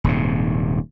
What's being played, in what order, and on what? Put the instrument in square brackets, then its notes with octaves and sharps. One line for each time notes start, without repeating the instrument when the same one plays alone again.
[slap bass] D#1 G#2 C3